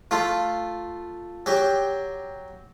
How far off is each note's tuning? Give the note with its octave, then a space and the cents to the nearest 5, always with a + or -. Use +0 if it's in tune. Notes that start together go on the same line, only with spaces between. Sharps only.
A3 +0 F4 +0
F#3 +10 G4 +10